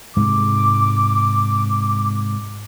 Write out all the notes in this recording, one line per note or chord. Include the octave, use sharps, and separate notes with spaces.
G#2 C3 G#3 D6